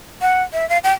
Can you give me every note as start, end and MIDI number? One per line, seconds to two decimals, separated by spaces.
0.22 0.43 78
0.53 0.68 76
0.69 0.78 77
0.84 0.93 79